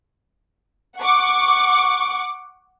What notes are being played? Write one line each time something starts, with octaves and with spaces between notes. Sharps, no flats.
F#5 C#6 D6